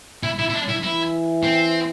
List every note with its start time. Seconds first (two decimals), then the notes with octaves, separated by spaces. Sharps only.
0.23 E4
0.39 E4
0.50 E4
0.54 D4
0.68 E4
0.83 E3 E4
1.43 C4